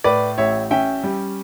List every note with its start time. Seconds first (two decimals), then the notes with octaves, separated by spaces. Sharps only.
0.04 A2 B4 D5
0.38 A1 C#5 E5
0.71 C#4 E5 G5
1.04 G3